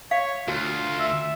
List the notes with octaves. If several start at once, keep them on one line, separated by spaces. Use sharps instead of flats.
C#5 F5
D2 F4 F#4
E5